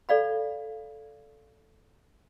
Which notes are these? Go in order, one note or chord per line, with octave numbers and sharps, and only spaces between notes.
A4 D5 F5 B5